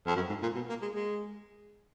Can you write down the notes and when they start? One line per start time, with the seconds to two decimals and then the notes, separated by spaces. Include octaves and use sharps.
0.07 F2
0.16 F#2
0.29 G#2
0.42 A#2
0.55 B2
0.69 A#3
0.82 G#3
0.95 G#3